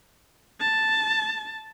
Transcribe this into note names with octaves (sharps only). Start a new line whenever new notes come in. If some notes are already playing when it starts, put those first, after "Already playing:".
A5